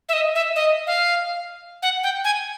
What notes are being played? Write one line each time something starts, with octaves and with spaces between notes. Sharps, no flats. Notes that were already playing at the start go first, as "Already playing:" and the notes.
E5
D#5
E5
D#5
F5
F#5
G5
G#5